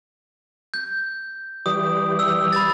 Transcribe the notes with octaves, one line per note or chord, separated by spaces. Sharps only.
G6
E3 G3 G4 D#6
E6
B5 A6